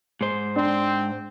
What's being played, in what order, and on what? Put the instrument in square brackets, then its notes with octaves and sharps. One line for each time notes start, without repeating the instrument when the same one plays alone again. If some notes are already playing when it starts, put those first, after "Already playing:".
[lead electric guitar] G#2 C5
[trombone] C4 [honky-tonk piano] D4